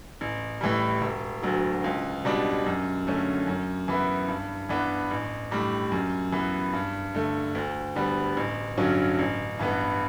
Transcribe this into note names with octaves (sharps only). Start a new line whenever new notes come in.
A1
A2 E3 G3
E1
D2 D3 F#3
C#2
B2 G3 D4
F#2
D3 A3 C#4
F#2
E3 B3 E4
G2
E3 B3 D4
A1
A2 G3 D4
F#2
E3 B3
G2
D3 A3
D2
D3 G3 B3
A1
G2 D3 F#3 C#4
A1
G2 E3 B3